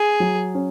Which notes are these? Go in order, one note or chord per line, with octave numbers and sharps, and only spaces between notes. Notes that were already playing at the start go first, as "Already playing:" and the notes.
Already playing: G#4
F#3
C#4